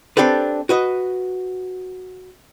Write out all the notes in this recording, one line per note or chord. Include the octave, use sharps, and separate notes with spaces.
C4 D4 G4 A4 B4
F#4 B4 D#5